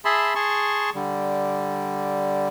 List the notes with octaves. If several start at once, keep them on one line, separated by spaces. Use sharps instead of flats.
G#4 E5 A5 B5 C6
G#4 A5 C6 C#6
D3 G3